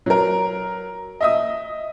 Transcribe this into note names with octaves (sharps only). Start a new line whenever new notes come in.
F#3 A#4
D#5 E5 D#6